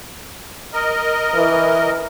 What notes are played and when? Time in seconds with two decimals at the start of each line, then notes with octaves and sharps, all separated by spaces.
0.73 A#4 D#5
1.35 E3